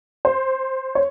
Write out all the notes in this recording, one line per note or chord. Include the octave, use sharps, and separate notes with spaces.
C5
C#5